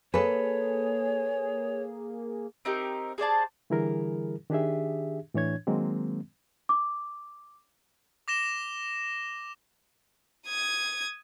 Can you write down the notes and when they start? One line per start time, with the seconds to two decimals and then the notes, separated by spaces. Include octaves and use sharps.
0.14 A#3 G#4 A4 B4 C#5
2.65 C4 D#4 G4 A#4
3.18 G#4 C5 D5 A5
3.70 D3 E3 G3 E4 G#4 A#4
4.50 D#3 D4 G4 G#4 E5
5.34 A2 E3 D4 C#5 G#6
5.67 D#3 F#3 G#3 A#3 C4
6.69 D6
8.28 D6 A#6 E7 G7
10.48 D#6 G#6